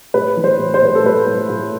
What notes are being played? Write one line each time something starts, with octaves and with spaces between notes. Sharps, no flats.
A2 B4
E3
C5
A2
C5
A2 B4
A4
A2 B4
A2
A2